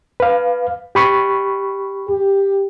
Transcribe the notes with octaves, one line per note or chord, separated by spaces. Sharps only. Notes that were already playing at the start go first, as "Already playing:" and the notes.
B4 F5
G4 B5 C#6
G4